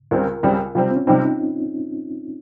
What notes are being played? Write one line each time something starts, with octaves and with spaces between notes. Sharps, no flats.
C#2 C#3 G3 C4 A#4
C#2 C#3 G3 C4
C3 G3 C4 F4
C4
C#4
C3 G3 C4 D#4